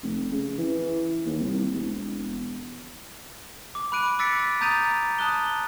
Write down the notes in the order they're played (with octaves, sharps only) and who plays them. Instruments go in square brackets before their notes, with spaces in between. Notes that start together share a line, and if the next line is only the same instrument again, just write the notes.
[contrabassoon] F1
C#3
E3
D#2
C2
E1
[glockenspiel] D6
B5 D6 F#6 D7 D#7
D6 E6 A6 B6 C#7 D7
A#5 D#6 G6 A6 D#7 F7
A5 D#6 F#6 G7